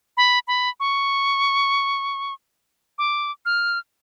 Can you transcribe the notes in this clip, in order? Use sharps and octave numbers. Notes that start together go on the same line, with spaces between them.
B5
B5
C#6
D6
F6